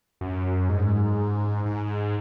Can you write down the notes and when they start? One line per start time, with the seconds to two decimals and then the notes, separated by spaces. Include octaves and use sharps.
0.21 F#2
0.69 G#2
1.65 G#2